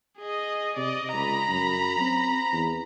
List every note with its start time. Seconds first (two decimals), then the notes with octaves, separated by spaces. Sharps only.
0.19 G#4 D#5
0.77 C3 D5 D#5
1.13 C#2 A#5 B5
1.49 F#2
2.01 C4
2.52 E2